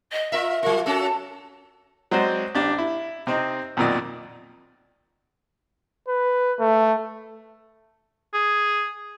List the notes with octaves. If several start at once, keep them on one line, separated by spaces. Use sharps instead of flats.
D#5
F4 A#4 E5
F#3 F4 A#4
C#4 F#4 A4 A5
F#3 G#3 C4 C5 D5 D#5
A1 D4 G4
E4
C3 C4 D#4
B1 F2 A#2 D#3 D5
B4
A3
G#4